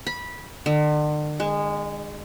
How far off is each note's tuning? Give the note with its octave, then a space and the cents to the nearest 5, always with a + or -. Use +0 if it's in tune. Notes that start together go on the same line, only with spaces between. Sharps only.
B5 -15
D3 +40
G#3 -20